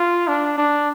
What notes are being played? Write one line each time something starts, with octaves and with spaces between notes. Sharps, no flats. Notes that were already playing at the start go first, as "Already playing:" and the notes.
Already playing: F4
D4
D4